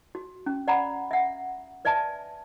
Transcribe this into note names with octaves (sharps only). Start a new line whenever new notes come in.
F#4
C#4
D5 F#5 A#5 B5
E5 F#5
B4 D5 E5 G#5 A5